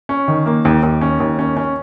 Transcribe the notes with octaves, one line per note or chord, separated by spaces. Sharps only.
C#4
D#3
A#3
D#2
D#2
C#4
D#2
C#4
C#4